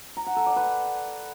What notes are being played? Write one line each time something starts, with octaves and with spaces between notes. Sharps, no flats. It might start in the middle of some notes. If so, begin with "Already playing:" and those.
A#5
F#5
A4
D5
B4